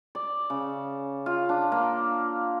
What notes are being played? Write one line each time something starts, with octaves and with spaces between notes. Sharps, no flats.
D5
C#3
F4
D4
A#3